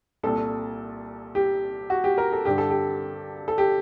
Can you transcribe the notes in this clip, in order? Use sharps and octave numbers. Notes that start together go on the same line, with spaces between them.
C2 A#2 A4
G4
F#4
G4
A#4
A4
G2 D3 G4
A4
G4
A4
G4